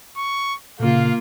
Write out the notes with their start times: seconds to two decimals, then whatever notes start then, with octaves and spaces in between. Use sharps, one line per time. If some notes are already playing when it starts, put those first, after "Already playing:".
0.17 C#6
0.80 A#2 C#3 A#3 F4 F5